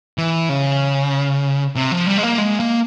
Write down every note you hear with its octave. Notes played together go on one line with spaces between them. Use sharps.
E3
C#3
C3
F3
G3
G#3
A#3
G#3
A#3